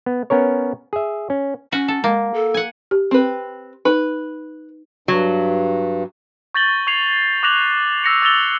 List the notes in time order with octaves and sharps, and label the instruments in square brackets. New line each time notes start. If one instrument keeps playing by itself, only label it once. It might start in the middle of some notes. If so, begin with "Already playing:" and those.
[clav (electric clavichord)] B3
B3 C#4 A#4 C#5
G#4 E5
C#4
[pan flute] C#4 [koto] F#4
[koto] A4
[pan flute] G#3 [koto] A#3
[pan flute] A4
[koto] F#5 G#5
[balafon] G4
[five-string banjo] C4 B4
[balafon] D#4 [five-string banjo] B4
[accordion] G2 [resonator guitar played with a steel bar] F#3
[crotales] C#6 G6 A6 A#6 F#7 G7
C#6 G#6 C7 F7
C#6 D6 F#6 A#6 F7 F#7
E6 A#6 C#7
E6 A6 A#6 F7 G7